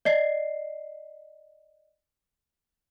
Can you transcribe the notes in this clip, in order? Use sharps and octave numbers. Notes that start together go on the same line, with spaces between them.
D5 D#5 C7